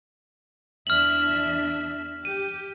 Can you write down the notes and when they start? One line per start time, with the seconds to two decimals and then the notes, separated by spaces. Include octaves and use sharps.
0.87 E2 D4 E5 F6 F#7
2.25 G4 D#7